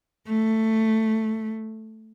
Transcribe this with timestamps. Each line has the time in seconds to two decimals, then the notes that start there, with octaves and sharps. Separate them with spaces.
0.27 A3